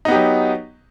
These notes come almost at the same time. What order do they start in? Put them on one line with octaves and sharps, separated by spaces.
D#4 B3 G4 F#3